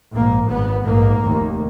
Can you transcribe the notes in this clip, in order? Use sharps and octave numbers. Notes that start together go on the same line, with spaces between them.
A#1 G#2 A#3
G#1 G#2 B3
A#1 G#2 A#3
F1 D#2